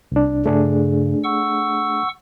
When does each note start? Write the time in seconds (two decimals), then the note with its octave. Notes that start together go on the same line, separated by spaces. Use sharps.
0.12 C2 D4
0.46 G2 C#3 A3 D4 G#4
1.24 F#5 C#6 E6